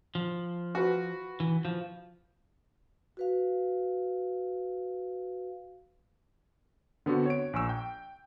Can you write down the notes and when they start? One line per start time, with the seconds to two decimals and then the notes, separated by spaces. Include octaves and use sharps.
0.15 F3
0.75 F#4 B4
1.40 E3
1.65 F3
3.17 F#4 B4 F5
7.06 D3 B3 C4 F#4
7.26 C#5 D7
7.53 A#1 G#5 C#6 E6
7.69 G5